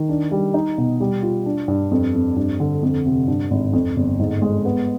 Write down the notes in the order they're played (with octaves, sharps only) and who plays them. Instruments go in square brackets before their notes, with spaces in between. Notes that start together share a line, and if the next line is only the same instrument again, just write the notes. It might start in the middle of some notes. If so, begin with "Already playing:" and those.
Already playing: [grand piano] D#3
D4
G3
D#4
B2
G3
F4
D4
G2
F2
F2
G2
D3
F2
C3
G2
G#1
F2
G1
G#2
G#3
B3